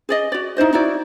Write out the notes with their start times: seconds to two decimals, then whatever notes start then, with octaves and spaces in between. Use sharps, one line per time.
0.09 G#4 D5 D#5
0.32 F#4 D5
0.57 D#4 E4 C5 D#5
0.73 D#4 E4 F#4 D5